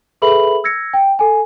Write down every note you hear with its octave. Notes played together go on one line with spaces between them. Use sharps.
G#4 A4 B4 E5 B5 F#7
E6 G#6 A#6 C#7
G5
A4 G#5